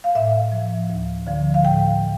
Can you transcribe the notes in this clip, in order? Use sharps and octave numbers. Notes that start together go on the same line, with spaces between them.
F5
A2 E5
F3
D2
D3 F3
F5
A2 G5
E3